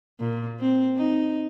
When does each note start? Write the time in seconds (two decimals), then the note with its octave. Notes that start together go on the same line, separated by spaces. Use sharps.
0.20 A#2
0.60 C4
0.97 D#4